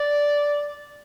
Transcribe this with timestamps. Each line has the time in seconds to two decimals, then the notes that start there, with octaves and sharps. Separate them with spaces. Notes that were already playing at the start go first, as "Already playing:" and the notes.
Already playing: D5